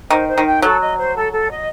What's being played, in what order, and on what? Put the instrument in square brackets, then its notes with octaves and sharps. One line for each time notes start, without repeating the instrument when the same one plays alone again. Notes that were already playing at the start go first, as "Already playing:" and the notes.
[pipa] D#3 [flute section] C5
[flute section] C5
[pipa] D#3
[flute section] G5
[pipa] F#3 [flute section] A4
[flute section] D#5
C5
A4
A4
D#5